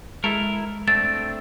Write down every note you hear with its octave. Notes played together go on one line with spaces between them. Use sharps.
G#3 E4 A4 A#4
A3 C4 D4 A6